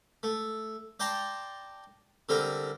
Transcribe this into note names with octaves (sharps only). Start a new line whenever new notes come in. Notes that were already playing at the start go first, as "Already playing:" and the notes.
A3
D5 G5 A5 A#5 C6
D3 G3 C4 A#4